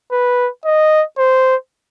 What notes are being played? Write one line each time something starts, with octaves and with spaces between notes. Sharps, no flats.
B4
D#5
C5